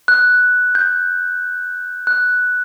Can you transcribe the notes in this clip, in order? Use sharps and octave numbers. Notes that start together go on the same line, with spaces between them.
F#6
G6
F#6